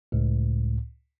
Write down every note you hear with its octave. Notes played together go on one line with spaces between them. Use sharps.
C#2 A2